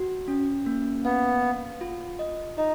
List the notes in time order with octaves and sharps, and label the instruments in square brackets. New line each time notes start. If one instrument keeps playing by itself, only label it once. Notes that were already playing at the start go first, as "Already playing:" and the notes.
Already playing: [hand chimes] F#4
C#4
A#3
[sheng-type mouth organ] B3 [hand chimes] F5
[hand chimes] F5
F4
D#5
[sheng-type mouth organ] D#4 [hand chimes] D#5